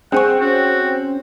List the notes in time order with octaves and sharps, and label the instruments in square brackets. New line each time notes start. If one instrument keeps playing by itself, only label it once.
[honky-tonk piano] C4 [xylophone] G#4 G#5 C#6 [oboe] F#5
[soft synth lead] C#4 [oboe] F#4